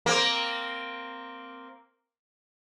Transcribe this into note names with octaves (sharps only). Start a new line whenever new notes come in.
A#3 C4